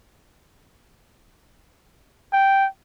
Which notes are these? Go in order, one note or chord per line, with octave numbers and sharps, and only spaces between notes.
G5